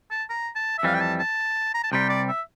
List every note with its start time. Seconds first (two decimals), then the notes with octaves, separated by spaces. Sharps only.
0.11 A5
0.30 A#5
0.56 A5
0.78 E5
0.83 F2 E3 G3 F5
0.94 G5
1.01 A5
1.19 A5
1.74 A#5
1.83 A5
1.92 C2 C3 G3 G5
2.09 D5
2.28 E5